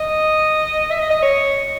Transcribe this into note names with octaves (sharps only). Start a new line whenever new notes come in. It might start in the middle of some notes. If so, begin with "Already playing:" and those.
Already playing: D#5
E5
D#5
D#5
C#5